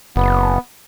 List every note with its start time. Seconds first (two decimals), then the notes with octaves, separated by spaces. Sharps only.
0.16 F#1 B3